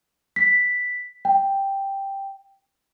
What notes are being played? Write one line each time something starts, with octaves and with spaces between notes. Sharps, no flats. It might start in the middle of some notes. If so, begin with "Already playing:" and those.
B6
G5